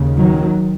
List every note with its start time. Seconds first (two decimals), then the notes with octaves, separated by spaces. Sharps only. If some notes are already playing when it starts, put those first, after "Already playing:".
Already playing: D#2 C#3
0.17 D#3 F#3